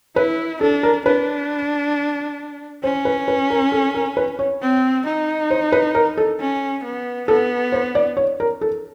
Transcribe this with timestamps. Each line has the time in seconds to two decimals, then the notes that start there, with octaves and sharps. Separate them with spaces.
0.16 E4 B4
0.61 D4 A4
0.83 A#4
1.05 D4 B4
2.84 C#4 C5
3.05 B4
3.28 B4
3.50 A#4
3.72 A4
3.95 A#4
4.17 B4
4.39 C#5
4.61 C4
5.05 D#4
5.51 C5
5.72 B4
5.95 A#4
6.17 A4
6.40 C#4
6.83 B3
7.28 B3 A4
7.72 C5
7.95 D5
8.17 C#5
8.40 A#4
8.61 A4